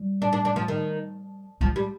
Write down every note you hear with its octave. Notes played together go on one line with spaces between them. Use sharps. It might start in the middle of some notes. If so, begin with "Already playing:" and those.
Already playing: G3
D4
D4
D4
F3
D#3
F3 G#3
G3